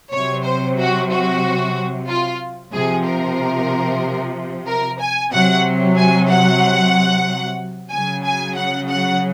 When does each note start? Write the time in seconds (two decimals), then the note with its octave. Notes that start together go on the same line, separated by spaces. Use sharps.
0.13 C3 F#3 C#5
0.45 C5
0.79 F#4
1.11 F#4
2.08 F4
2.74 C3 F3 G#4
3.06 A#4
4.68 A#4
5.01 G#5
5.32 C3 F#3 F#5
5.97 G#5
6.29 F#5
7.91 C#3 F#3 G#5
8.25 G#5
8.56 F#5
8.89 F#5